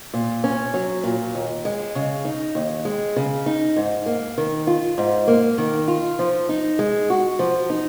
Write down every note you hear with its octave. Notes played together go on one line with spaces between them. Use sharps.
A#2
C#4
F#3
A#2
D#2
G#3
C#3
D#4
D#2
G#3
C#3
D#4
G#2
A#3
D#3
F4
G#2
A#3
D#3
F4
F3
D#4
G#3
F#4
F3
D#4